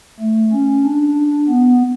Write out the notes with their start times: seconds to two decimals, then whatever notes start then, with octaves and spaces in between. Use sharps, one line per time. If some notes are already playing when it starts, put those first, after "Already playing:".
0.20 A3
0.52 C#4
0.84 D4
1.49 B3